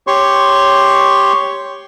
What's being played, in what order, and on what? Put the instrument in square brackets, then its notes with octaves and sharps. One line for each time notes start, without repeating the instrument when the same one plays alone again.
[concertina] G4 C#5 C6 C#6